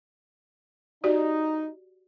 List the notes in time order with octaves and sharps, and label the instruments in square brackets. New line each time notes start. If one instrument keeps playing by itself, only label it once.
[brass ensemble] D#4 [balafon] F#4 G4 D5